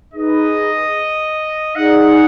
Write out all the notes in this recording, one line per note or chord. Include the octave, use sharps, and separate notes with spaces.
D#4 G#4 B4 D#5
D#4 G#4 D5 F#5